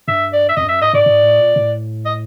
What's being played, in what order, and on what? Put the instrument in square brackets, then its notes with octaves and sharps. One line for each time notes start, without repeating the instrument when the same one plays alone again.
[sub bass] G2 [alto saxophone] E5
[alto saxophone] D5
E5
[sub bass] F2 [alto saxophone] D#5
[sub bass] G2
[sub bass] F#2 [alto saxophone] E5
[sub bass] G#2 [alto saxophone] D#5
[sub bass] G#2 [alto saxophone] D5
[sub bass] G#2
A2
A#2
A2
[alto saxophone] D#5